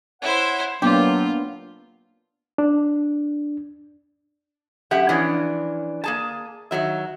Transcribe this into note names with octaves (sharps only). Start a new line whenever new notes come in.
E4 C5 C#5 F#5
F#3 A#3 B3 D4 F4 G4
D4
F#2 G4 E5 F#5
E3 F3 C#4 D4
A#3 G#4 A5
D#3 F3 F#3 E5